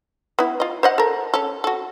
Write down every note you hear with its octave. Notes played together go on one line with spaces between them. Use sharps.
B3 E4
F4 D#5
C5 D#5 F#5
A4 A#4
C#4 A4
F#4 A4